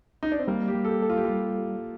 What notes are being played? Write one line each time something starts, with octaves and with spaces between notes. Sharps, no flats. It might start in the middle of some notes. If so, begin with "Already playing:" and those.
D#4
D4
C4
G3 A#3
G4
G3
A4
G4
A4
F4
G4
G3 F4